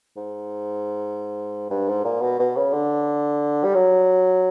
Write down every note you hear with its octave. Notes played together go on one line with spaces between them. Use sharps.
G#2
G2
G#2
A#2
B2
B2
C#3
D3
G3
F#3